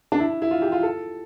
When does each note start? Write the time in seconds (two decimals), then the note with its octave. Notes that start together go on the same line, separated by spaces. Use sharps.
0.12 D4
0.20 E4
0.42 E4
0.51 F4
0.62 G4
0.72 F4
0.83 A4